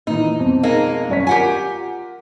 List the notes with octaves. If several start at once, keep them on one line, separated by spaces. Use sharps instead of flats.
A#2 E3 D#4
F2 B2 C4
G#3 A#3 D#4
F#2 C#5 B6
F4 G4 A#4 F#5 G#5